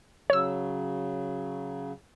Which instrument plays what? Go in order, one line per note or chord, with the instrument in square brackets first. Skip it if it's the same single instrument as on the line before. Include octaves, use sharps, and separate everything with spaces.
[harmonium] C#3 F#3 [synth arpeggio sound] C#5 E6